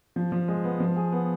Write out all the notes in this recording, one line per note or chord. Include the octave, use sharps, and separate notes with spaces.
F3
F3
G#3
B3
F3
G#4
B3